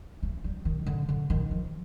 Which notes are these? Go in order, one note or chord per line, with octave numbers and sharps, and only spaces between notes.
A3
G3
D#3
D3
D3
D#3
F3